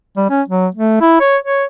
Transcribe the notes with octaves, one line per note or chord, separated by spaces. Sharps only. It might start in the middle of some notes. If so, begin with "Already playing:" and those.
G3
C#4
F#3
A3
E4
C#5
C#5